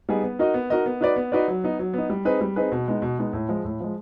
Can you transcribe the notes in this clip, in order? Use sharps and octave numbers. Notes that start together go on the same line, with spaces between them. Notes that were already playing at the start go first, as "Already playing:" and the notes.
G3 B3 D#4 G#4
B3
D#4 F#4 A#4 D#5
B3
D#4 F#4 A#4 D#5
B3
D#4 F#4 B4 D5
B3
D#4 F#4 B4 D5
F#3
B3 D#4
F#3
B3 D#4
G3
C4 D#4 G#4 B4
G3
C4 D#4 G#4 B4
B2
G#3 B3 D#4
B2
G#3 B3 D#4
A2
F3 G#3
A2
F3 G#3